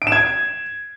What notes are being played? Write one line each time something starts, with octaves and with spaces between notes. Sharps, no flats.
D7
E7
G#6